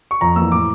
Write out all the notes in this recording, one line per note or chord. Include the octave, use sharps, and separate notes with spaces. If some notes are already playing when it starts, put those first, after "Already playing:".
C#6
F2 A#5
E3 A#3 E6
A2 D6